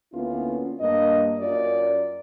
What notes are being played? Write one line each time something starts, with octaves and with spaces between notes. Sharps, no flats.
D2 A#3 B3 C#4 E4 F4
G2 A#3 D#5
F#2 F4 A#4 D5